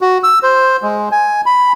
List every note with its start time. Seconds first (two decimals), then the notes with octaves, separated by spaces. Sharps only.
0.01 F#4
0.23 E6
0.43 C5
0.83 G#3
1.12 G#5
1.46 B5